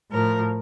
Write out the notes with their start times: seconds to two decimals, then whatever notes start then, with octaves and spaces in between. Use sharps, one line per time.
0.10 A2 F3 A#4